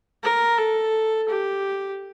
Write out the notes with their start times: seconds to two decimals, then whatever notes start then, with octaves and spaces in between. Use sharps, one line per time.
0.23 A#4
0.58 A4
1.28 G4